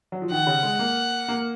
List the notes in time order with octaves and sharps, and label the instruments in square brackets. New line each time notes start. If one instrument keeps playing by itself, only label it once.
[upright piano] F#3
F3
[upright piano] D#3 [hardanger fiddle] F#5
[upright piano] C#3
G#3
A#3
A#3